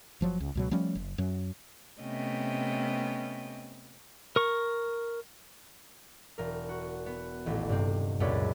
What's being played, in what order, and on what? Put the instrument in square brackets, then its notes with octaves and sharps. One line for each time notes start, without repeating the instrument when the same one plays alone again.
[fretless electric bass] F#1 F3 F#3
C#2
C#2 B2 F#3
F3 G3 A3 C#4
F#1
F#2 F#3
[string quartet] C3 A3 B3 C#4 D#5 G5
[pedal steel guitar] A#4 C#6
[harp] E1 A#4
F#4
B3
D#1 A1
G2 C3 C4
C#2 F#2 A#2 C#4 D5 B5